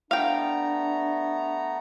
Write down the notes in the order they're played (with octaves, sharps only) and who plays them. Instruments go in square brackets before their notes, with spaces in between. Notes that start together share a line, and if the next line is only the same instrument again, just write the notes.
[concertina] A3 B3 A#5 [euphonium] D4 [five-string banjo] F5 G5